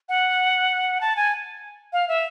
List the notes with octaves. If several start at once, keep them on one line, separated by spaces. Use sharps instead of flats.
F#5
A5
G#5
F5
E5